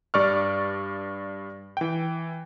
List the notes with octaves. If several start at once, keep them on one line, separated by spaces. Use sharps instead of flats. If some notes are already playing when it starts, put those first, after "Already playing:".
G2 D5 C#6 F6
E3 G5